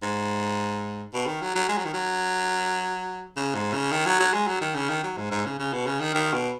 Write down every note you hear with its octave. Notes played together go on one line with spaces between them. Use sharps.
G#2
B2
D#3
F#3
F#3
G#3
F#3
D#3
F#3
C#3
G#2
C#3
D#3
F#3
F#3
G#3
F#3
D#3
C#3
D#3
F#3
G#2
G#2
C#3
C#3
B2
C#3
D#3
D#3
B2